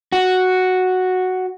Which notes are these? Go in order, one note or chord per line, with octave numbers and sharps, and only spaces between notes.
F#4